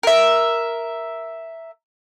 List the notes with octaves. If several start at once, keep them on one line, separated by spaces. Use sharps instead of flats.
A#4 E5